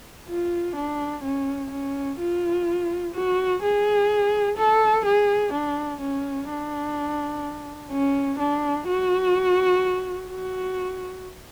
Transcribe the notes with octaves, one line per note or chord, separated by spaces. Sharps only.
F4
D4
C#4
C#4
F4
F#4
G#4
A4
G#4
D4
C#4
D4
C#4
D4
F#4
F#4